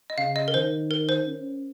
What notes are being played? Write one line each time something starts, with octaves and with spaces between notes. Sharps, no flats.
D#5
C#3 F5
D#5
A#4
D#3 C5
A#4
C5
C#4